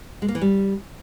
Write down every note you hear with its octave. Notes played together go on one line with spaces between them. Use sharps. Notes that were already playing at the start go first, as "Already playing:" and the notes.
G#3
A#3
E3
G3